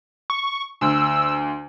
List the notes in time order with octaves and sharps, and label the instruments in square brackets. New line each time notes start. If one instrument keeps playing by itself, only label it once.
[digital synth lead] C#6
[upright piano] D2 [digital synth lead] E6